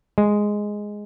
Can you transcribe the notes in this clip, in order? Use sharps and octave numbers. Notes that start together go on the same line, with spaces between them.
G#3